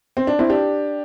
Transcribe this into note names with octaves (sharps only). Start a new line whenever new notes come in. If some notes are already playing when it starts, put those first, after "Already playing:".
C4
D4
C4 E4
D4 G4